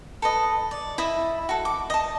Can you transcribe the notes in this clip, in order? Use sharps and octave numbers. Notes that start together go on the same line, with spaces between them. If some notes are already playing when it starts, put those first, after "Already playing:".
A4 B4 D#5
D5
E4 D#5 E5 B5
F#4 A4
D6
D#5 A5